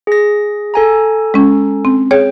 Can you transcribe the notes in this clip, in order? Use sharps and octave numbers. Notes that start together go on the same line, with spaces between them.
G#4 A#6
A4 G#5 A#5
G#3 C#4
C4
G#4 C#5 G5